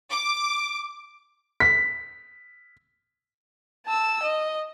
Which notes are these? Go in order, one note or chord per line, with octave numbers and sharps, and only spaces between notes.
D6
B6
A5 E6
D#5